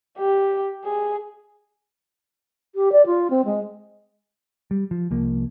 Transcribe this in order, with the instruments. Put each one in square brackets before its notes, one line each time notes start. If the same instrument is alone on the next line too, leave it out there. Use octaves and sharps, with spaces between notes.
[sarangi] G4
G#4
[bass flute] G4
D5
F4
C4
G#3
[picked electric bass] G3
F3
C2 F3 A#3